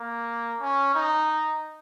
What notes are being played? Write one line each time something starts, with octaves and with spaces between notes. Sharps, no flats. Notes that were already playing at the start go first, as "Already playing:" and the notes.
Already playing: A#3
C#4
D#4